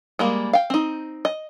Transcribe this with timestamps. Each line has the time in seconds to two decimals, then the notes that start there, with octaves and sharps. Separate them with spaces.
0.19 G3 G#3 A#3
0.53 F5 G5
0.70 C4 D#4
1.25 D#5